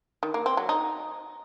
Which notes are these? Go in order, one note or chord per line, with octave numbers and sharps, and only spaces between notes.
D#3
A#3
C4
F#3
D#4